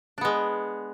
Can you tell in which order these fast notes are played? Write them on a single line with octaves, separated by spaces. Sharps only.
D4 B3 G#3